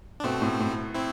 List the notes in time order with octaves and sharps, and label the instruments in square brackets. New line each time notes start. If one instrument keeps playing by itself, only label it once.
[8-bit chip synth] D4
[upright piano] B2 [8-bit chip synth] A3 C4
[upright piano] A2
A2
[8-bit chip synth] C4 E4